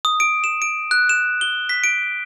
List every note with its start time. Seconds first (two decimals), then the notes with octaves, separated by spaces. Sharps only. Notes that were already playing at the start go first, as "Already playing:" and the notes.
0.05 D#6
0.20 D7
0.44 E7
0.62 D7
0.91 F#6
1.09 E7
1.41 G7
1.69 B6
1.84 D7